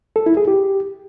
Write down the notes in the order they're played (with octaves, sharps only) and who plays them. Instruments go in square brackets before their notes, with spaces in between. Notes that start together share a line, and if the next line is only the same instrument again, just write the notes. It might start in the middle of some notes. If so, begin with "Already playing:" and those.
[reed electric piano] A4
E4
G#4
G4